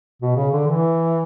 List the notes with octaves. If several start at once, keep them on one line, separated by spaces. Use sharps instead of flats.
B2
C#3
D3
E3